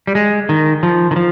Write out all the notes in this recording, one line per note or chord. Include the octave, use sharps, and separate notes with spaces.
G3
G#3
D#3
F3
D#3
F3